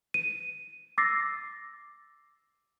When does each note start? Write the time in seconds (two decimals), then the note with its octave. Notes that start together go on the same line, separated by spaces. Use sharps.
0.14 D#7
0.98 D6 E6 A6 A#6 C7